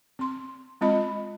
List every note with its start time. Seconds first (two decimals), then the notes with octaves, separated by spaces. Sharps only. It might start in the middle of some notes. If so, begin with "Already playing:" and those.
0.19 C4 C6
0.81 G#3 C4 F4 D#5 B5